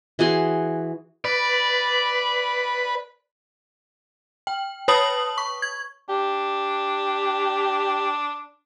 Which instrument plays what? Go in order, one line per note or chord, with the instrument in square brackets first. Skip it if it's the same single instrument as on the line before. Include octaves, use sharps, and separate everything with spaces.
[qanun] E3 F#4 G#4 C6
[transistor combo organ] B4 [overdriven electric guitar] D5
[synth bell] G5
B4 C#5 A5 B5 D#6 F#7
C#6
G#6
[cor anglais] D4 [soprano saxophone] G4